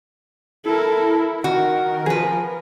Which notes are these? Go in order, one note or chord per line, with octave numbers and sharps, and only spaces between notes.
E4 A4 A#4
D#3 F#4 A#4
F3 G#4 B4